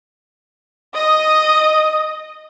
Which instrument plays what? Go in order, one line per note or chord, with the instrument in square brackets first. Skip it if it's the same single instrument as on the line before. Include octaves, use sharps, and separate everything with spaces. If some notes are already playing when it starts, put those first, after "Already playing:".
[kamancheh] D#5 D#6